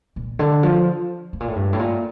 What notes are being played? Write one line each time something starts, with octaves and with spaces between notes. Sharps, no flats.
A#2
D3
F3
A2
A#2
A2
G2
A2
A#2